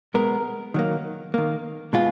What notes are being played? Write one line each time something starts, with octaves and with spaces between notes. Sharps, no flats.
B2 G#3 B3 A#4
D#3 F#3 A#3
D#3 A#3
B2 G#3 B3 F4